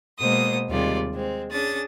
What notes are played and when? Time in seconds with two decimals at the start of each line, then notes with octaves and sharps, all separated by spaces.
0.19 B2 G#3 A#3 C5 D#6
0.70 D#2 C3 G3 G#3 F4 D5
1.13 G#3 C4
1.52 C#4 D4 G#4 D#6 A6